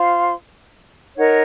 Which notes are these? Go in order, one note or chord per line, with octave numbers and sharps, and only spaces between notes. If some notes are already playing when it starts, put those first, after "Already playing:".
Already playing: F4 C5 F5 C6
D#4 A#4 C#5 F#5